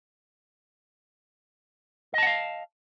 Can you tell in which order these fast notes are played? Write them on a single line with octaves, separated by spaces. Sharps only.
D#5 A5 F#5 F5